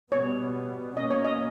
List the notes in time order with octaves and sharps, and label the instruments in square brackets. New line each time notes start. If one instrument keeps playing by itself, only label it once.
[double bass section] B2 G3 B3 [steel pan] C#5
[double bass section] B2 A#3 C#4 [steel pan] D#5
[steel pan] C#5
D#5